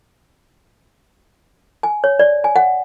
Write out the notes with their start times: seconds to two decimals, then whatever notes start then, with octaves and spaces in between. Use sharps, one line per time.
1.83 G#5
2.04 C#5
2.19 D5
2.44 G#5
2.56 F#5